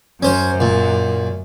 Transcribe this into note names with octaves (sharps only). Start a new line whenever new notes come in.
F#2 C#4 C5
A#2